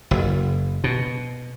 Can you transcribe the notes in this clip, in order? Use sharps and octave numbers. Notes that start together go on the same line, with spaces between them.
F#1
B2